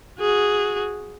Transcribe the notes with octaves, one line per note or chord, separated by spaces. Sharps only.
F#4 G#4